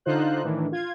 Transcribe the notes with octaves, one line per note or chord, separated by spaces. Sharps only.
D3 D#4 F4 C5 F#6
A2 D#3 E3 D4
F4 G#6